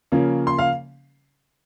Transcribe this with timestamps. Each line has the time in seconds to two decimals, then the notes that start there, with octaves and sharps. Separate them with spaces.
0.12 C#3 F3 A#3 C#4
0.47 C6
0.58 F5